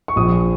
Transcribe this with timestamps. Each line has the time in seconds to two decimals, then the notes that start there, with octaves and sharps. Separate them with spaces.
0.08 C#6
0.16 A#1 D#6